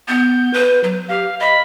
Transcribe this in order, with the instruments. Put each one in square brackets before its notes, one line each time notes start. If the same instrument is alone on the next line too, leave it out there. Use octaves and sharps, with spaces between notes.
[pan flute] B3 [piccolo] G6
[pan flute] B4
F#3
[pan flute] G4 [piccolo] F5
[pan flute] D#5 [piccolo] B5